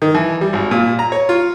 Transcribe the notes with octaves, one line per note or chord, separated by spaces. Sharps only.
D#3
E3
G3
G#1
A#2
A#5
C#5
F4